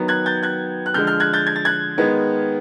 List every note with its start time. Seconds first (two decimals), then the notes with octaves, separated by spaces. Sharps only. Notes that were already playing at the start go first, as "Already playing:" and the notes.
Already playing: D#3 F#3 B3
0.08 F#6 G#6
0.26 G6 A6
0.43 F#6 G#6
0.86 F#6
0.94 D3 F3 G#3 F6 G6
1.07 F6 G6
1.20 F#6 G#6
1.33 G6 A6
1.47 G#6
1.56 A6
1.65 F#6 G#6
1.98 D#3 G#3 B3